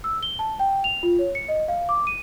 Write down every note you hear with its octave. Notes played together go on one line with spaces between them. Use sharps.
E6
G7
A5
G5
F7
F4
C#5
C#7
D#5
F5
D6
D#7